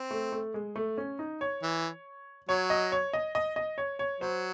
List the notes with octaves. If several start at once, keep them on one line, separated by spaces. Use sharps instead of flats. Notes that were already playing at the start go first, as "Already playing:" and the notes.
Already playing: C4
A3
A3
G#3
A3
C#4
D#4
C#5
E3
F#3 C#5
D#5
C#5
D#5
D#5
D#5
C#5
C#5
F#3 C5